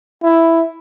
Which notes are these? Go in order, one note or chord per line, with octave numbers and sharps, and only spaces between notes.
E4